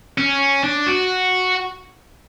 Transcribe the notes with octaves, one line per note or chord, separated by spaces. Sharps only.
C#4
D4
F#4